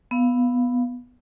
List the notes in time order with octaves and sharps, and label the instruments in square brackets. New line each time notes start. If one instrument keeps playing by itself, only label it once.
[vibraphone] B3 F5